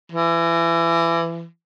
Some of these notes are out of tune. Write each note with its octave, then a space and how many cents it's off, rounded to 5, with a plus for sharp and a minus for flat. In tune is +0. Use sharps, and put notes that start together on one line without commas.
E3 +25